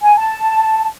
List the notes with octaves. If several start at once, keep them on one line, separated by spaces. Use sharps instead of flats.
G#5
A5